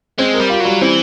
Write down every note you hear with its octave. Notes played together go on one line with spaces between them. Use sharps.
G#3 C4
A#4
G3
F4
F#3 G3
E3 C4